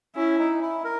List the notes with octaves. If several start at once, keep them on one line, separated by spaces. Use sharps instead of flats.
C#4 E4
D#4
E4
A#4